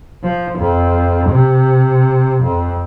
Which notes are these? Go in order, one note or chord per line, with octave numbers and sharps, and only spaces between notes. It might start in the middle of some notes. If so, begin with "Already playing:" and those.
F3
F2
C3
F2